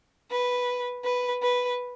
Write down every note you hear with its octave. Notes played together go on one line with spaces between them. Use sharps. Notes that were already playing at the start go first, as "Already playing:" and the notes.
B4
B4
B4